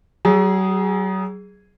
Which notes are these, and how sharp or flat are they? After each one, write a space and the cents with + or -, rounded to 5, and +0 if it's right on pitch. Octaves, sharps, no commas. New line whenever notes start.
F#3 +40 G#4 -5